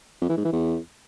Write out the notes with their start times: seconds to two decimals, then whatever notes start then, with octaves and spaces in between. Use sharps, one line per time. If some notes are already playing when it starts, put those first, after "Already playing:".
0.21 F2
0.29 E3
0.37 G#2
0.45 E3
0.53 E2